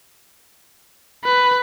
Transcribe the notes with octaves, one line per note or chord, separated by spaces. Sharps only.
B4